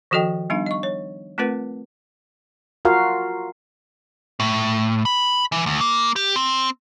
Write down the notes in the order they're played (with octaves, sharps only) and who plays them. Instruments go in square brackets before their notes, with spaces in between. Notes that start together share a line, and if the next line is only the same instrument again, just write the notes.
[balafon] D#3 F3 F#4 A4 D#5 G5
G3 B3 D4 D#4 F5
D#5 C#6
C#5
A3 C4 F4 A#4 B4 F#5
[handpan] F4 F#4 A#4 F5
[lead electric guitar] A2
B5
E3
D2
A#3
G4
C4